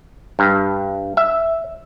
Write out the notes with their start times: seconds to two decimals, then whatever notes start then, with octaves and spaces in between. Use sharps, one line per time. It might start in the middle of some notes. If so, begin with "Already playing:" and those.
0.39 G2
1.17 E5